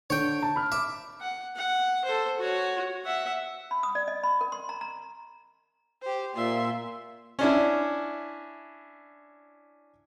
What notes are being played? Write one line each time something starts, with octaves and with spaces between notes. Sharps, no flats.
D3 C#5 G5
A5
B5 F6
E5 D6
F#5
F#5
A4 C5
F#4 C#5
E5 F#5
B5
D#6
D5
D#5
B5
A#4
C6
A#5
A#5
G4 C5
A#2 E5 C6
C#4 D4 E4